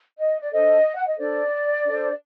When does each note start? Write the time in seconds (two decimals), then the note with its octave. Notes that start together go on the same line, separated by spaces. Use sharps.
0.18 D#5
0.40 D5
0.52 D4 A4 C5 D#5
0.95 F#5
1.07 D#5
1.18 D4 A4 C5 D5
1.85 D4 A4 C5